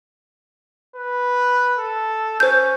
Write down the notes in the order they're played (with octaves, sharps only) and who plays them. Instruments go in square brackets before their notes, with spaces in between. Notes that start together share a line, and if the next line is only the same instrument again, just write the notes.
[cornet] B4
A4
[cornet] C#4 [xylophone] C5 G6